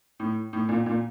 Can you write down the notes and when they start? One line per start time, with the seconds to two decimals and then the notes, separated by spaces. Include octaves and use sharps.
0.20 A2
0.53 A2
0.69 A#2
0.86 A#2